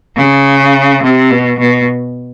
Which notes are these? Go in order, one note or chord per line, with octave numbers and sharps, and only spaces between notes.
C#3
C3
B2
B2